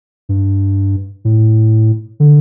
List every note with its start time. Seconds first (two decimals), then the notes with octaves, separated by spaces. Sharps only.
0.29 G2
1.25 A2
2.20 D3